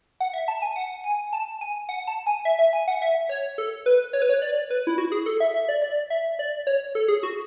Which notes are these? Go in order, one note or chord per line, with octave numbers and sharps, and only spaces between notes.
F#5
E5
A5
G#5
F#5
G#5
A5
G#5
F#5
A5
G#5
E5
E5
G#5
F#5
E5
C#5
A4
B4
C#5
B4
C#5
D5
B4
E4
F#4
G#4
A4
E5
E5
D5
D5
E5
D5
C#5
A4
G#4
F#4